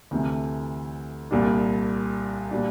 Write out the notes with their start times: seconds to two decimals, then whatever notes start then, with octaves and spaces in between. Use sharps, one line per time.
0.11 D2 C3 E3 A3
1.31 C2 A#2 G3 D4
2.51 A#2 G3 D4